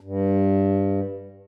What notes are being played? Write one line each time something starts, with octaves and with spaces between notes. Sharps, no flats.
G2